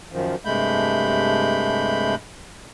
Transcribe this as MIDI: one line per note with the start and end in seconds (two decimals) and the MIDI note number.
0.12 0.35 42
0.12 0.35 51
0.12 0.35 53
0.45 2.15 43
0.45 2.15 48
0.45 2.15 56
0.45 2.15 57
0.45 2.15 83
0.45 2.15 91